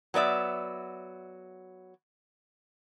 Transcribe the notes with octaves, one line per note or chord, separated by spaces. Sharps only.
F#3 B3 D5 E5